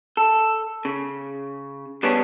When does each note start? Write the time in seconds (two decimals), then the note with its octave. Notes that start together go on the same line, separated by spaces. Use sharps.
0.17 A4
0.85 C#3
2.03 G3 B3 C#4 D4 G#4 C#5